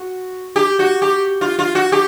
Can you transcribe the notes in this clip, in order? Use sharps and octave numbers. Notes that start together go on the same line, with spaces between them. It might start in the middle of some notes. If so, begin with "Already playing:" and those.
Already playing: F#4
G4
F#4
G4
F4
F4
F#4
G4